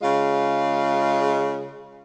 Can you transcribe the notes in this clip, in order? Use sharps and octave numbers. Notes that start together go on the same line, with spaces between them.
C#3 G#3 F4